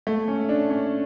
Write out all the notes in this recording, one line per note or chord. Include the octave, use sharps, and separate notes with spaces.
A3
C#4
D4
C#4